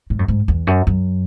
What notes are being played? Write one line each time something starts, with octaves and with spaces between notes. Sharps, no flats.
G#2
F#2
G#2
E2
F#2
F#2